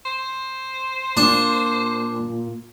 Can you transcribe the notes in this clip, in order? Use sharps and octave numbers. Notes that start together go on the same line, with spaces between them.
C5
A#2 D4